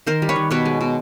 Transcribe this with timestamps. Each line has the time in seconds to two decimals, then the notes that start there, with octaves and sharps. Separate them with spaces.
0.06 D#3 A#4 C5
0.22 G3
0.29 B4 C#5
0.36 D#3
0.51 B2 B4 C#5
0.65 G#3
0.81 B2